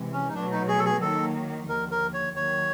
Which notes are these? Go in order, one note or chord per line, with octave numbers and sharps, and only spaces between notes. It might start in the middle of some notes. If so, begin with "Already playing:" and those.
Already playing: C3 E3 G#3
C#4
D#4
B2 F#3 A3 D4
D#4
G#4
A4
G#4
D#3 F#3 A#3 D#4 A4
D#2 D3 F3 A#4
A#4
C#5
D#2 D#3 F#3 C#5